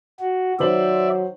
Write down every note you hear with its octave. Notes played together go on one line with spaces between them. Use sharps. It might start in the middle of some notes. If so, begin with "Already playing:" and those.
F#4
D#3 F#3 C5 D5 E5 F#7